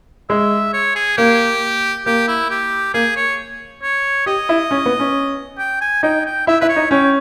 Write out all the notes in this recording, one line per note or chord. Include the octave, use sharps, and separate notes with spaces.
G#3 E5
C#5
G#4
A#3 G4
A#3 G4
E4
G4
A#3 G#4
C#5
C#5
G4 D#5
E4
C#4
B3
C#4
G5
G#5
D#4 G5
G5
E4 E5
E4 B4
C#5
D#4
C#4 G5